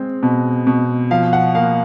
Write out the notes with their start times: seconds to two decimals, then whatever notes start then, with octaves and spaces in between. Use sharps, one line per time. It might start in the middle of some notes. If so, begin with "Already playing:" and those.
Already playing: G#3 C4
0.23 B2
0.67 B2
1.11 F3 F5
1.33 F#5
1.55 A#3 F5